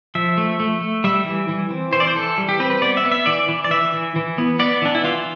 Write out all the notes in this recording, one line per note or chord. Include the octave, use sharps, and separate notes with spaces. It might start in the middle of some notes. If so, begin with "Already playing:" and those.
F3 E5
A3
A3
A3
G3 E5
E3
E3
C4
E3 C5
D5
C5
E3 A4
G3
G4
C4 B4
B4
B3 D5
E5
B3
E5
E3 D5
E3
D5
E3 E5
E3
E3
B3
B3 D5
E3 D4
E4
E3 F4